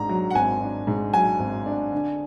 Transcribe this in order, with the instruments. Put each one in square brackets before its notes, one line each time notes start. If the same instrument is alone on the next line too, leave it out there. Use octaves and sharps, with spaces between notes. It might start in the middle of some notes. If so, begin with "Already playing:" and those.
Already playing: [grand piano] G#1 G#2 D4 [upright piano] A#5
[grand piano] F#3
[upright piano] F#5
[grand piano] G#1 [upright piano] G#5
[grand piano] D4
G#2
[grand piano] F#3 [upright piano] G#5
[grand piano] G#1
D4
D3